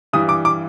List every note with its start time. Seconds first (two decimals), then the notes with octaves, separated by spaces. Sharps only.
0.13 G2 E3 G3 D#6
0.29 D6
0.45 D6